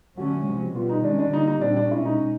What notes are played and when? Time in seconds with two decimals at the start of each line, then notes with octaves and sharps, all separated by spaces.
0.17 D3 F#3 A3 C#4 F#4
0.46 C3 F3 G#3
0.75 B2 G3 B3 F4
0.89 D#4
1.04 D#3 G#3 C#4 D4
1.19 D4
1.32 D3 G3 A#3 D#4
1.47 D#4
1.61 A#2 G3 C4 D4
1.77 D4
1.90 B2 G#3 C#4 E4
2.05 D#4